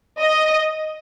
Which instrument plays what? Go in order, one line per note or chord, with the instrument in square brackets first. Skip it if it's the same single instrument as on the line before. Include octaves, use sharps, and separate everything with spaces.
[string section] D#5